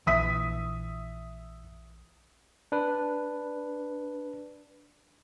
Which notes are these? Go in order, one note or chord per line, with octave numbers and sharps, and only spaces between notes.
A#1 E3 E5 D#6 B6
D4 B4